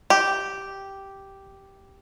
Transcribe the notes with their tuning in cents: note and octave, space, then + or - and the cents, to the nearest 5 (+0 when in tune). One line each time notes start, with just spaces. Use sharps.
G4 -5